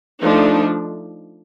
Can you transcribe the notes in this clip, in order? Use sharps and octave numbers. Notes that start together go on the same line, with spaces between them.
F3 A3 D4 D#4